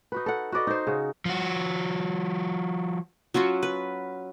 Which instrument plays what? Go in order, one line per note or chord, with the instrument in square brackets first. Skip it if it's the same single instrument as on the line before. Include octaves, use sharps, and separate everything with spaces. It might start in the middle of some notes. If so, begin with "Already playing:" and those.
[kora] D#4 F#4 B4
A4 F#5
F#4 B4 D5 D#5
D#4 C5
C#3 F#4
[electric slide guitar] F3 F#4
[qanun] F#3 C#4 F4 F#4
B4